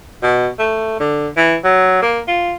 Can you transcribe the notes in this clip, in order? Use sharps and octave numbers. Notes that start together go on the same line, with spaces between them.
B2
A3
D3
E3
F#3
A#3
F4